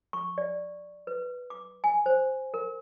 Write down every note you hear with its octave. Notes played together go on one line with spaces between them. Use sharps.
C#6
D5
B4
D6
G#5
C5
A#4